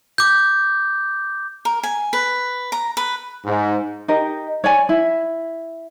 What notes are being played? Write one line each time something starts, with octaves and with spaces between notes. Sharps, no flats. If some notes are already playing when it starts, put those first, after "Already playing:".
D6 G6
A#4
G#5
B4
A#5
B4
G#2
D#4 G4 A#4
C#5 D5 G#5
E4